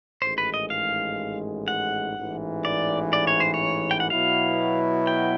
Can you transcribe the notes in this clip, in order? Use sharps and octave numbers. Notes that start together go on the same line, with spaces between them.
A1 G#2 D#3 G#3 C5
B4
D#5
F5
F#5
A1 G#2 E3
D5
D5
C#5
C5
C#5
G5
F#5
B2 F#3 B3 E4 F5
G5